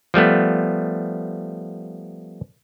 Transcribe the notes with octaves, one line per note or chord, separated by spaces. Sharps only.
F3 G3 A3 B3